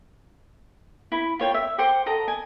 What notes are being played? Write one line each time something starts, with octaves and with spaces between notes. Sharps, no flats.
E4 B5
F4 C#5 G5
E5
C5 F#5 G5 D6
A4 D#5 A#5
G#5